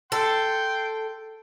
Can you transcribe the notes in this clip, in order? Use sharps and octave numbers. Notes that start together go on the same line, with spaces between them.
A4 G5 C6